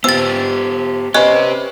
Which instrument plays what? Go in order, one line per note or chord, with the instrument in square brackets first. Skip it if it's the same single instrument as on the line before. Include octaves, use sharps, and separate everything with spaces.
[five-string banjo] F3 [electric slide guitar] B3 G4 [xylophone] E6 A6
[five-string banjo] C#4 B4 [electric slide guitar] G4 C5 [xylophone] D#5 F#6